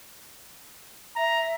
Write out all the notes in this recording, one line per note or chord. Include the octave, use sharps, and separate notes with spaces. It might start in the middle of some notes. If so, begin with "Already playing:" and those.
E5 A#5